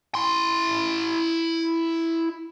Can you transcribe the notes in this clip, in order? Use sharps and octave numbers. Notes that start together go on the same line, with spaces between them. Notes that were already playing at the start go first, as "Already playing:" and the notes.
E4 C6